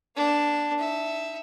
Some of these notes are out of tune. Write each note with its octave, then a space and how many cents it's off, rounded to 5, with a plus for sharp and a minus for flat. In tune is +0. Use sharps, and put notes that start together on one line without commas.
A#3 +45 D4 +0
D#4 +35 E5 +0